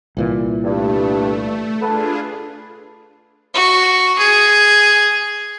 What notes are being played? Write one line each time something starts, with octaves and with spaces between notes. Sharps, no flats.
C2 A#2 E3
G2 A3
D4 F4 G#4 A4 B4
F#4
G#4